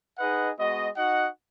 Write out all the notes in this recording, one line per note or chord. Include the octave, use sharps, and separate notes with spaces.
D#4 G#4 B4 D#5 F#5
G#3 B3 F#4 D#5
D#4 F#4 D#5 F#5